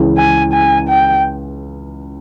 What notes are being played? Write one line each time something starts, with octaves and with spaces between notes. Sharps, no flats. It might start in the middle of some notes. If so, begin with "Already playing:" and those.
Already playing: C#2 C#3 E3
G#5
G#5
G5